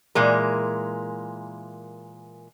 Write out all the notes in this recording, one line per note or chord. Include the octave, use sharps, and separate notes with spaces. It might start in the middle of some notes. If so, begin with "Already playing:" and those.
A#2 E3 G#3 A#4